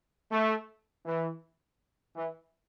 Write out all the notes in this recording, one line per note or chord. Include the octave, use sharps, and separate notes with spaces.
A3
E3
E3